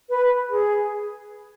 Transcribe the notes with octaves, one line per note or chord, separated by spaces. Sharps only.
B4
G#4